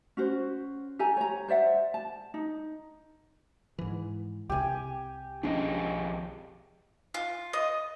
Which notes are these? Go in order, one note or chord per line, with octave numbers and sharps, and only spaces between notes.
C#4 F#4 C5
G4 A4 G#5 A#5
C#5 A#5
C5 D5 E5 F#5
A5
D#4
G#2 E3
C2 C3 G4 G#5
B1 F2 C#4 D4 G#4 D#5
F4
D#5